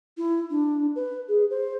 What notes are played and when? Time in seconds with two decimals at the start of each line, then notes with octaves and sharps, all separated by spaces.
0.17 E4
0.50 D4
0.95 B4
1.28 G#4
1.50 C5